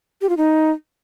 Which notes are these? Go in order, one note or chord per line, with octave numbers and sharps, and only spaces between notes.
G4
F4
D#4